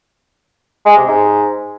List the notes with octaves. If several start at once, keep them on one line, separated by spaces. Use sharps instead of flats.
G#3
C3
G#2